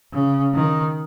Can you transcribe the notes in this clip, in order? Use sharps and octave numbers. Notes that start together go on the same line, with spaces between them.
C#3
D#3